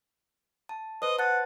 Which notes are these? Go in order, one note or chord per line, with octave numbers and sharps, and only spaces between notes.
A5
B4 C5 D#5
F#5 A5 A6